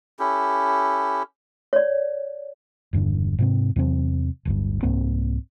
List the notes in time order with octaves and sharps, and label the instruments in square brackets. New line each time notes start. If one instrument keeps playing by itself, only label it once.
[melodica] C#4 E4 G4 A4
[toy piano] C#5 D5
[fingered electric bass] E1 G2 A#2 D3
G#2 C3 C4
E2 C3 F#3 C4
D1 G1 G2
C2 G#2 A#3 C4